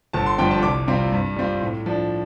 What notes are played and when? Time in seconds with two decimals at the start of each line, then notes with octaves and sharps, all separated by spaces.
0.13 G1 A5
0.26 C6
0.38 G2 D3 F3 C4 G5
0.51 A5
0.62 C2 D6
0.87 C3 G3 C4 F4
1.12 G2
1.36 G3 C4 F4
1.61 A2
1.86 F3 D4